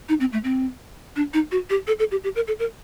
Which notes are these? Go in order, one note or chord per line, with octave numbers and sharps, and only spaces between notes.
D#4
C4
A3
C4
D4
D#4
F#4
G4
A4
A4
G4
G4
A#4
A4
A#4